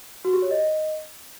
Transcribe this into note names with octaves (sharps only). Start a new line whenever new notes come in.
F#4
G4
C#5
D#5